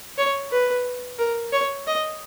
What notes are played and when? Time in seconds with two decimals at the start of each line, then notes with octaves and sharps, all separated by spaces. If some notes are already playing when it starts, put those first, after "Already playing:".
0.18 C#5
0.52 B4
1.18 A#4
1.52 C#5
1.86 D#5